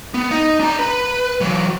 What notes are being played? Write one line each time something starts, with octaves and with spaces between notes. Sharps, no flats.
B3
D#4 D#5
D4 A#5
B4
E3 F#3